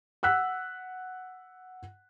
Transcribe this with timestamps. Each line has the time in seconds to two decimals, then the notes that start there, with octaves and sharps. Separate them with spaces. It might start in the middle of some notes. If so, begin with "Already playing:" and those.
0.23 F#5 E6 F#6 B6